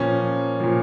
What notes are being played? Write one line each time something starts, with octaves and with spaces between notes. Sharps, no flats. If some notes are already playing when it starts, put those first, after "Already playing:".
Already playing: A#2 F3 C#4
A#2 F3